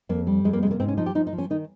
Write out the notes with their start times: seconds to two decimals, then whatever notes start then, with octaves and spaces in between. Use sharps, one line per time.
0.09 F2 A#3
0.27 G3
0.44 F2 G#3
0.53 A#3
0.62 C3 G#3
0.71 A#3
0.79 G#2 C4
0.88 C#4
0.97 F3 D#4
1.06 G4
1.15 F3 D#4
1.27 D#4
1.33 F3
1.38 C#4
1.50 D#3 D#4